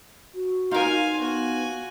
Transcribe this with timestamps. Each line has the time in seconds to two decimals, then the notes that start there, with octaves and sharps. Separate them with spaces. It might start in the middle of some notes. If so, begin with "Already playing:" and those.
0.35 F#4
0.71 D#4 F4 A#4 F5 G#5
1.19 B3 F#4 G#5